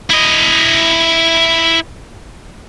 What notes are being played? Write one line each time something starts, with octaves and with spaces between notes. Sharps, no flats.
E4 D#5